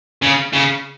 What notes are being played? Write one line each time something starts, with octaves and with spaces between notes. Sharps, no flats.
C#3
C#3